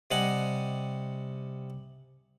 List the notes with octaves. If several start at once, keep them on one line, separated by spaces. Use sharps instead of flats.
C3 G3 D#5 F#5 G#5